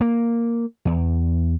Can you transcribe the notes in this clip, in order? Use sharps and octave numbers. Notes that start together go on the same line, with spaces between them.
A#3
E2